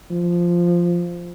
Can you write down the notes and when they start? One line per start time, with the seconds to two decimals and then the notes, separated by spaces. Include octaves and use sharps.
0.11 F3